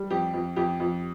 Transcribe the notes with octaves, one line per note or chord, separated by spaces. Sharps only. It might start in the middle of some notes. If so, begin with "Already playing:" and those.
Already playing: G3
F2 G4
F2
F2 G4
F2